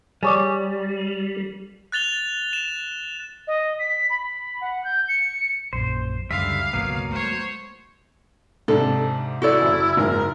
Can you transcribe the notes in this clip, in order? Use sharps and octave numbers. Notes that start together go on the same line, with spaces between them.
G3 G#4 C#5 D5
F#6 A6 F7 G7
E7
D#5
B6
B5
F#5
G6
C#7
A#1 F#2 A#2 C5
C#2 F#2 D3 G3 E5 F5
G1 C#2 B2 F#3 A#3 B3
G#3 A3 C5 C#5
G#2 C3 D4 A4
E4 F#4 A4 D5
F#1
F#1 G#2 E4 A#4